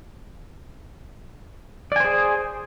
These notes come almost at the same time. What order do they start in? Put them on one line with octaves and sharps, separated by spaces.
D5 G#5 C5 G#4